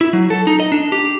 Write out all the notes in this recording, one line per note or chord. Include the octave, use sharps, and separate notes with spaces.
E4
F#3
A4
D#4
D#5
D4
G4